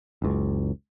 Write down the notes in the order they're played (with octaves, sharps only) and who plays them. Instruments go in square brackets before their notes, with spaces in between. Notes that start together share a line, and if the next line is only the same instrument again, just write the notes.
[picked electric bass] F#1 C#2